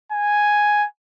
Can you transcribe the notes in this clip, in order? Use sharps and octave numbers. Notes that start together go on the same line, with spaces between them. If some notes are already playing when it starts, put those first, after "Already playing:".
G#5